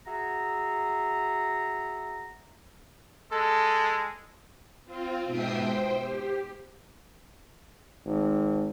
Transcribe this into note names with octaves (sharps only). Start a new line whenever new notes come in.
F#4 G#4 E5 A#5
G#3 A4
C4 F4
G#2 B2 E5 G5 D#6 C7
C5 G5
G4
G#1